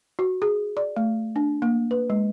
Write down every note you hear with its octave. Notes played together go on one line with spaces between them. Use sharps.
F#4
G#4
D5
A3
D4
A#3
B4
G#3